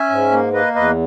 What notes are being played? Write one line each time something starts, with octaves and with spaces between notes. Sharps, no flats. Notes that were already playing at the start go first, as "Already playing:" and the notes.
Already playing: C#4 E5 G#5
G#2
A#3
A#3 B4 D#5
E2 B4 D#5